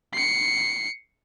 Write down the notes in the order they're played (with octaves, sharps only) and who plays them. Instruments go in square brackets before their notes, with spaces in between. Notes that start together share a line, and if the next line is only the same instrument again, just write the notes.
[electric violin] C7 C#7